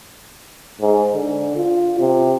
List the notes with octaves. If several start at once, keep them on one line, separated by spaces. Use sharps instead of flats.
G#2
D3
F4
C3